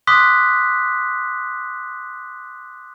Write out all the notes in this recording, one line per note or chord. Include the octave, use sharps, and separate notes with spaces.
C6 D6 D#6 F#6 B6